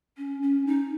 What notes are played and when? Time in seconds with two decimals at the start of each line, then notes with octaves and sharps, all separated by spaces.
0.17 C#4
0.42 C#4
0.67 D#4